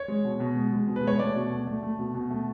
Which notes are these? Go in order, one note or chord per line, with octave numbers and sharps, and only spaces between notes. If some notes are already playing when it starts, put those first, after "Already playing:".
Already playing: C#5
G#3
B2
B2
G#3
G#3
B2
B4
G#3 C#5
A3 D5
B2
A3
A3
A3
B2
B2
A3